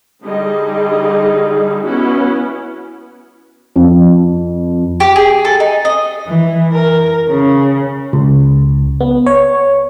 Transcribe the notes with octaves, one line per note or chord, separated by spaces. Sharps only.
D3 G3 D#4 G#4 D#5
B3 C#4 E4 F#4
F2
G4
G#4
A4
D#4
D#5
E3
A#4
C#3
C#2
B3
C#5